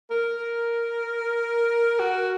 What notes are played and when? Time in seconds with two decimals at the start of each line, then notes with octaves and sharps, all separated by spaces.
0.11 A#4
1.99 F#4